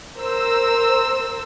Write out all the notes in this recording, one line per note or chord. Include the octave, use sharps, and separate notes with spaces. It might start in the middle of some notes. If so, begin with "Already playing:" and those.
A#4 C5 E6